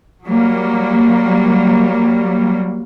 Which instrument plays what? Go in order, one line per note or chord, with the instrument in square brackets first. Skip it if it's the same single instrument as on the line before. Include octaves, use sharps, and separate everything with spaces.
[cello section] F#3 G3 A#3